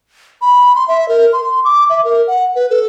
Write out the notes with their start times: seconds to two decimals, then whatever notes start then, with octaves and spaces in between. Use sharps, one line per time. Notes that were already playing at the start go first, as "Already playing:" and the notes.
0.42 B5
0.75 C6
0.88 E5
1.08 A#4
1.33 C6
1.64 D6
1.90 E5
2.05 A#4
2.27 F#5
2.55 B4
2.70 A4